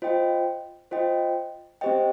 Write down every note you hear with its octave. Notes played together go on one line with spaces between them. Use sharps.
F4 C5 D#5 G5
F4 C5 D#5 G5
C4 G4 C5 D#5 G5